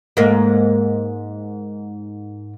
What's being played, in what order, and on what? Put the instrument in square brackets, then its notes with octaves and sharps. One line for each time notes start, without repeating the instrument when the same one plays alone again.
[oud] G#2 A#3